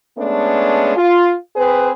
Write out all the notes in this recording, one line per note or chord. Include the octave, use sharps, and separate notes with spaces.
G#3 A3 B3 C#4 D4
F4
C4 G#4 B4